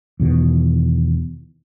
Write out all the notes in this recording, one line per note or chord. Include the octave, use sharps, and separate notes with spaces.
E2 B2 D#3